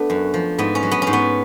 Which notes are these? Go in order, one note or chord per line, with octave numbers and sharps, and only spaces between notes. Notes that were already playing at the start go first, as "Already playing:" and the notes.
Already playing: A3 B3 D4
F#2
F3
G#2 B3
C#4
F#3
B3
G#2 C#4
B3